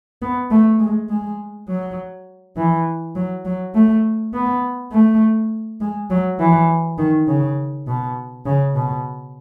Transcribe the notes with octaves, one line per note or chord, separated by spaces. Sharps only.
B3
A3
G#3
G#3
F#3
E3
F#3
F#3
A3
B3
A3
G#3
F#3
E3
D#3
C#3
B2
C#3
B2